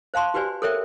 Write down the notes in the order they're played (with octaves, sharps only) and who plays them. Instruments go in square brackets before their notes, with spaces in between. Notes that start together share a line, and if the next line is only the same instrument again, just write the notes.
[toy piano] C5 F5 A5 C6 C#6
F#4 G4 B4 C5 D5 G#5
A4 A#4 C5 C#5 E5 G5